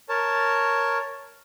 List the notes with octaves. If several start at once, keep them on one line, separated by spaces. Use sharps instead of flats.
A#4 C#5 A5